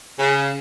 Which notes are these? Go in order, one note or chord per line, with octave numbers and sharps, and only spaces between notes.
C#3